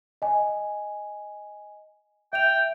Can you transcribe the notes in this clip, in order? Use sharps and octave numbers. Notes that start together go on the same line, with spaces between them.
D#5 G#5
E5 G5 F7